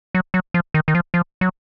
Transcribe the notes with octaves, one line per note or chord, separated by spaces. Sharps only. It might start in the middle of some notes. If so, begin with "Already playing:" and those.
F#3
F#3
F3
D#3
D#3
F3
F3
F#3